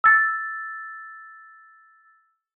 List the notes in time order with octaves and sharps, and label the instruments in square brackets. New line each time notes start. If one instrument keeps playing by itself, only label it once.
[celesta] E6 A6